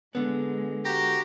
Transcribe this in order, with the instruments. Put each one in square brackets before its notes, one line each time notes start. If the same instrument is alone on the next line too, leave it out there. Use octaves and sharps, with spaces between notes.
[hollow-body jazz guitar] D3 B3 [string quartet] G#3
[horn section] F#4 G4 [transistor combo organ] A#5